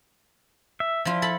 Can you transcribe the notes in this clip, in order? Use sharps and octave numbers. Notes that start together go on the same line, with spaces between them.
E5
F3 E4 F4
A4 B5